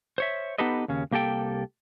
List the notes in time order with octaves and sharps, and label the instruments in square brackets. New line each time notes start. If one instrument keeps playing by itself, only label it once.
[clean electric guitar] C5 C#5 E5
B3 D#4 G4 A4 B4 D#5
D#2 C#3 C#4
C2 A#3 G4 A4 G5